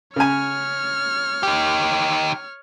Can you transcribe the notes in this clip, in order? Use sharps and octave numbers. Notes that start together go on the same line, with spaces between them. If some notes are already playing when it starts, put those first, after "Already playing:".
C#3 C#5 G#5 F6
D#4 G4